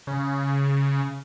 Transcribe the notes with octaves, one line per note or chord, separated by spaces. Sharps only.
C#3